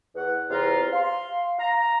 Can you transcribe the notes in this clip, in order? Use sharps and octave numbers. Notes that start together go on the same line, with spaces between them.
E2 F#5
E2 C3 F4 A#5
F5 C6
F5 A#5